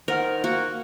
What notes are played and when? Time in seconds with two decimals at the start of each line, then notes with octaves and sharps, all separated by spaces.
0.08 D#3 A#4 C5 F#5 F6
0.44 A#3 F#4